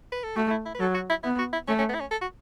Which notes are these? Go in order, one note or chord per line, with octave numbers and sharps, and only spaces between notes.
B4
A4
A3 F#4
E4
E4
B4
F#3 A4
F#4
E4
B3 E4
F#4
E4
A3 C#4
C#4
B3
E4
C#4
A4
F#4